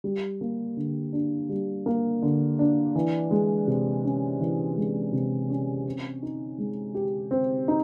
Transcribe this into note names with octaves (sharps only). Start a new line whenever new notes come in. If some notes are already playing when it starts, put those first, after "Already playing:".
G3
A#3
D3
D4
G3
A#3
D3
D4
E3
G#3
C3
C#4
E3
G#3
C3
C#4
C4
D#4
G#3
G4
C4
D#4